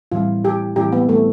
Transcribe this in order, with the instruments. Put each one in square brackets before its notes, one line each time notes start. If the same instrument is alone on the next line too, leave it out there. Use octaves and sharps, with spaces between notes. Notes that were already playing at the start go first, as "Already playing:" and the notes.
[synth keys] A2 E3 G3 C4 E4 [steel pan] F4
[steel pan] G4
[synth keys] A2 E3 G3 C4 E4 [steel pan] G4
[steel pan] B3
A3